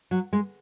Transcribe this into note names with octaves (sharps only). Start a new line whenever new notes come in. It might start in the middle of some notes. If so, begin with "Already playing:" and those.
F#3
G#3